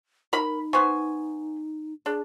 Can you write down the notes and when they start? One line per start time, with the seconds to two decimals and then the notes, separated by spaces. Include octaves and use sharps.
0.33 D#4 A#4 B5
0.73 B3 C5 G#5 C#6
2.06 D4 G#4